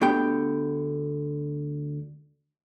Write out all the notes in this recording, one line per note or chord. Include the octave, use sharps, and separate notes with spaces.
D2 D3 B3 G4 G5